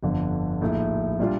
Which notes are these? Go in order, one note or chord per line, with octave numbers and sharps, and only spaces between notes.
G1 F2 D3
A#1 A2 A3 D#4
A#2 G3 D4 F4